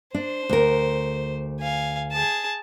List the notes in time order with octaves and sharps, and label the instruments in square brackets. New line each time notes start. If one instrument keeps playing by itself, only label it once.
[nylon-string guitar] D4 [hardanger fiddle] C5
[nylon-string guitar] D2 A#4
[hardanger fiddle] F5 G#5
G#4 A5